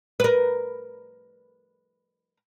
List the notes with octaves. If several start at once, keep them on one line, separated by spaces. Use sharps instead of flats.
A#4 B4